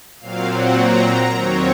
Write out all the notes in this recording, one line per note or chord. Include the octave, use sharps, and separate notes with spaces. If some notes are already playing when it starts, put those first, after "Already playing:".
A#2 F#3 C4 F5
F#5
A#5
A#5
D#2 D#3 F#3 C4 C#5